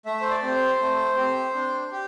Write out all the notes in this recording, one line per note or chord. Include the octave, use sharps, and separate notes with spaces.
A3 E5
C5
D5
C4 G4
C5
A3
C4 G4
D4
G4